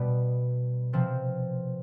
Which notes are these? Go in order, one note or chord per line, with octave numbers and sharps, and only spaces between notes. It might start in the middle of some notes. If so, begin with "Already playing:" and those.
Already playing: B2 G3 B3
C3 F3 C4